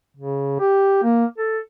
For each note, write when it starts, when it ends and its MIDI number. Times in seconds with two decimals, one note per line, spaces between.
0.17 0.57 49
0.60 1.03 67
1.03 1.25 58
1.38 1.59 69